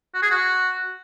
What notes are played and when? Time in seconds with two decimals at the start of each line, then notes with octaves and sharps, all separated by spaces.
0.14 F#4
0.22 G#4
0.30 F#4